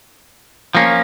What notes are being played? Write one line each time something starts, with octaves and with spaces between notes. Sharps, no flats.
F3 A#3 C#4